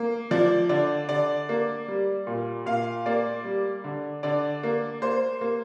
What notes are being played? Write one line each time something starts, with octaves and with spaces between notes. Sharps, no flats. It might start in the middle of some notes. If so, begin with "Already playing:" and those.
Already playing: A#3
F3 D5
D3 D5
D3 D5
A#3
G3
A#2
A#2 F5
A#3 D5
G3
D3
D3 D5
A#3
A#3 C5
A#3